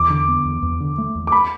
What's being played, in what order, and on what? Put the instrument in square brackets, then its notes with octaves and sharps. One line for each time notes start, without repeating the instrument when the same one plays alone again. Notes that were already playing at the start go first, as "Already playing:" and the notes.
Already playing: [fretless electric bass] E2 [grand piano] D6
[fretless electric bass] D3
B3
E2
E2
D3
A3
E2
[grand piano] D6
B5